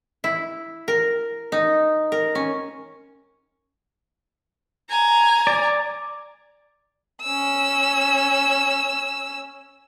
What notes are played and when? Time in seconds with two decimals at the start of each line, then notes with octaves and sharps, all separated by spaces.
0.24 E4
0.88 A#4
1.52 D#4
2.12 A#4
2.35 C#4
4.90 G#5 A#5
5.47 D5
7.23 C#4 E6